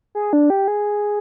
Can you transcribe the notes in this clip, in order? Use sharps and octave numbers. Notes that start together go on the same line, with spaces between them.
G#4
D4
G4
G#4